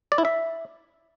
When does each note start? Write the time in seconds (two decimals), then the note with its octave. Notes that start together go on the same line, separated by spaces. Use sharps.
0.12 D5
0.18 E4
0.25 E5